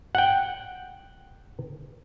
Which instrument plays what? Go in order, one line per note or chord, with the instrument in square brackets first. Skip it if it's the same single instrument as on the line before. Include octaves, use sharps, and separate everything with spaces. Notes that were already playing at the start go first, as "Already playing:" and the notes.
[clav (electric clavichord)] F#5 G5